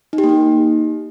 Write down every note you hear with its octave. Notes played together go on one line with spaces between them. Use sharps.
D#4
G4
A#3
D#4